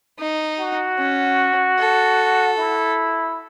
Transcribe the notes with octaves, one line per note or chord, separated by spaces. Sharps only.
D#4
F#4
C#4
A4
E4